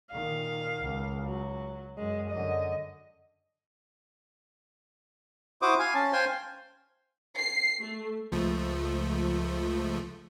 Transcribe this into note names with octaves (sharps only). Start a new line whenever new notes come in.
A#2 D#3 F5
C#2
F#3
F#2 G#3
F#2 D3 D#5
E4 F#4 C5 D6 D#6
F5 G#5
C#4 A5
C5 F5 G5 G#5 C6
C7
A3
C#2 F3 A3